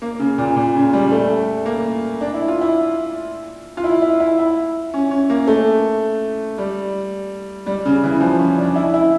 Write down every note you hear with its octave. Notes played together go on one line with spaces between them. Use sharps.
A#3
C#3
A#2
A#2
C#3
G3
A3
A#3
D4
E4
F4
E4
F4
E4
E4
E4
E4
C#4
C#4
A#3
A3
G3
G3
C#3
E3
F3
C#4
D4
E4
E4